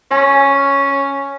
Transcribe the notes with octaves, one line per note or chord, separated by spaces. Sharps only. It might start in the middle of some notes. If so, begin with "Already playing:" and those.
C#4 G#5